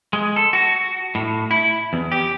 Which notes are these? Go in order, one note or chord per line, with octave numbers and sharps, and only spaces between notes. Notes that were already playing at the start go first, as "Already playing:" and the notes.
G#3
A4
F#4
A2
E4
E2
G4